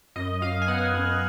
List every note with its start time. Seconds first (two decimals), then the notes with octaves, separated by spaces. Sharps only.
0.16 F#2 D#5
0.42 F#2 F5
0.62 G#5
0.68 B3 F#5
0.94 F#2